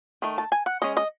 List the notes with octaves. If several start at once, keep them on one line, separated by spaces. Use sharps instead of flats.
D#3 A3
A5
G#5
F#5
G#3 C#4 D#5
D#5